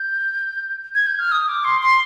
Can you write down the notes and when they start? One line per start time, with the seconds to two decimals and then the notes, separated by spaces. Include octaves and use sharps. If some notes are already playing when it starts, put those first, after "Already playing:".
Already playing: G6
0.95 G#6
1.07 G6
1.19 F6
1.32 D#6
1.48 D6
1.64 C6
1.82 C6